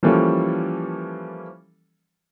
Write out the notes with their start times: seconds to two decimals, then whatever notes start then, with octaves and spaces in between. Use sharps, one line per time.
0.03 E3 F3 G3 A#3 C#4 A4